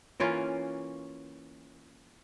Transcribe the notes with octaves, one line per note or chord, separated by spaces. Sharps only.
E3 A#3 C#4 F4